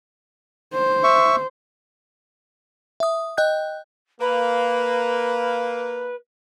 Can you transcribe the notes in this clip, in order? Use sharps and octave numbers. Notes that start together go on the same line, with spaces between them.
C5
E5 C#6
E5 D#6
D#5 G5 F#6 G6
A#3 B4